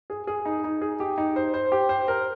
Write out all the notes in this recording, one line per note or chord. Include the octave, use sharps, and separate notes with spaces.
G#4
G#4
D#4
D#4
G#4
G4
D#4
C5
C5
G4
C5
A#4